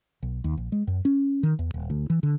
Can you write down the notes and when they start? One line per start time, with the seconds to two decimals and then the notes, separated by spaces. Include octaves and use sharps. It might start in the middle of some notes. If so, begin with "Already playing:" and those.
0.23 B1
0.44 D#2
0.57 A#1
0.72 G#3
0.87 F#2
1.05 C#4
1.43 D#3
1.59 E2
1.74 D#1
1.90 D2
2.10 E3
2.23 D3